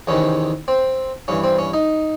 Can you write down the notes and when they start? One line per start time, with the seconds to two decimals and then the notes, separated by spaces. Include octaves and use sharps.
0.07 E2 C3 D#3 C#4
0.68 C4
1.28 G2 E3 C#4
1.44 C4
1.58 C#4
1.74 D#4